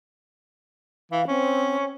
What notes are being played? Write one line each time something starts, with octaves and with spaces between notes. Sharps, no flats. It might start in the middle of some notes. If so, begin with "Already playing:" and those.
E3 F5
C4 C#4